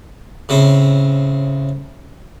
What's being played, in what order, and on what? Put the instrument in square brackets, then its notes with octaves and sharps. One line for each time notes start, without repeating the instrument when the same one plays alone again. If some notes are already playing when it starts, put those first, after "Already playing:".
[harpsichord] A2 C#3 C4